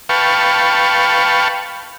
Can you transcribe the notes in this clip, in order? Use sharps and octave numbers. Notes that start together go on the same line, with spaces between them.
B4 F5 G5 A5 C#6